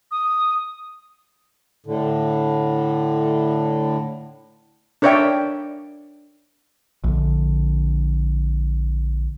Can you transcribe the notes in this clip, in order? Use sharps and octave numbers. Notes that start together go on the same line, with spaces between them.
D#6
A2 D3
D4 A#4 C#5 D5 E5 G5
A#1 D3